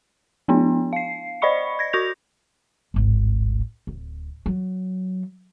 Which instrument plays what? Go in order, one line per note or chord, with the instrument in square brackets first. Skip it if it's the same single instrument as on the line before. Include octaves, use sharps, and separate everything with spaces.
[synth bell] F3 B3 D4 E4
F5 C7
C5 D5 D#5 B5 C#6 C#7
G#6 A#6
F#4 C#6 G6 A#6 F7
[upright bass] D1 G#1
D1
F#3